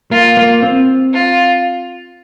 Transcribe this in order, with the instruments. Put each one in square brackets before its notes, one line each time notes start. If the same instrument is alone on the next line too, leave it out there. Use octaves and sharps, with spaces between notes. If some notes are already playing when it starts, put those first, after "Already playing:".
[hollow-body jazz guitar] A#3 [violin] F4
[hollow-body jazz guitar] A#3
C4
[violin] F4